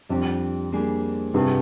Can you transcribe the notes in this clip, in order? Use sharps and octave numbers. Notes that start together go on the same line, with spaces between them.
F2 G3 D4 G4
G3 A#3 D4 G#4
G2 C3 G3 C4 F4 G#4